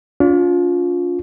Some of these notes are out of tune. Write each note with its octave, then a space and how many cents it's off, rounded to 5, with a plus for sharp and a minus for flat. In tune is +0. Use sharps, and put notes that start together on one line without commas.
D4 -45 F4 +20